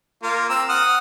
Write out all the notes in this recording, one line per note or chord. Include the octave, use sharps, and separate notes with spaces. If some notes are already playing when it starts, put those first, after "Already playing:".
A#3 F4
C4 A#5 E6
F#5 D#6 F6